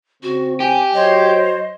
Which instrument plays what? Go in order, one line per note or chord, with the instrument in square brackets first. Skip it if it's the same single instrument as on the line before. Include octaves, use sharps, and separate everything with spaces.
[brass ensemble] C#3 C4 [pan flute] F#4
[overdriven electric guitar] G4 [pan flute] G#5
[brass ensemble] F#3 [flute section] C5 C#5 [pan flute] D#5